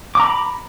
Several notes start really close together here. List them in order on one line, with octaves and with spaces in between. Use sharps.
D6 A#5 B5